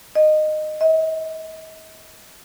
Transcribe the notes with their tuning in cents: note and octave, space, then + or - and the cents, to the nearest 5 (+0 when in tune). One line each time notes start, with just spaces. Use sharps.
D#5 -15
D#5 +45